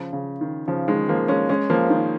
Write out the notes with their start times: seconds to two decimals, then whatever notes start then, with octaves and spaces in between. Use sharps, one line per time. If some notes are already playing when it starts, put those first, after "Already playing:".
Already playing: C#3 F3
0.13 C#3
0.41 D#3
0.68 C#3 F3
0.88 D#3 G#3
1.09 F3 A#3
1.28 G#3 C#4
1.49 G#3 C#4
1.70 F3 A#3
1.90 D#3